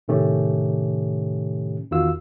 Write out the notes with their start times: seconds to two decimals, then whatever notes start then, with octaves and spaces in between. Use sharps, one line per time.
0.08 A2 C3 D#3 A3 C#4 G4
1.91 E2 D#3 F4 F#4 F5 E6